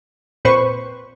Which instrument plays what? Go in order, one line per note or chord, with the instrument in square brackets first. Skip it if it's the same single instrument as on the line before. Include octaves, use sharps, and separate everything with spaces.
[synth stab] A#2 C4 B4 C5 C#6